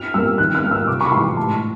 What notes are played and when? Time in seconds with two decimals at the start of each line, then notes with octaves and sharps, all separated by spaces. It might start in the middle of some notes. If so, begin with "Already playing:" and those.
Already playing: F6
0.14 G3 A#3 E6
0.38 D#3 F#6
0.55 F6
0.63 G3 A#3
0.71 E6
0.87 C3 D6
1.01 C#6
1.06 B5
1.12 E3 G#3 C6
1.37 A2 A5